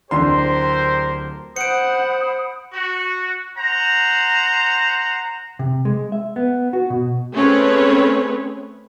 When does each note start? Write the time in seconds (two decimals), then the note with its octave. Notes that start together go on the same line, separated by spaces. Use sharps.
0.11 D1 D3 G4 A#4 C5 C6
1.56 C5 F#5 B5 D#6 G6 C#7 D7
2.73 F#4
3.57 C5 F#5 A#5
5.59 C3
5.85 G#3
6.12 E5
6.36 B3
6.73 F#4
6.90 B2
7.34 A3 C4 C#4 G#4 B4 C#5